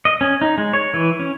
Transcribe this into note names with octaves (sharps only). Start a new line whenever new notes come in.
D#5
C#4
D#4
G#3
C#5
E3
C#4